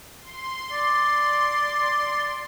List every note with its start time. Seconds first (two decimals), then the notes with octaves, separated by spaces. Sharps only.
0.21 C6
0.72 D5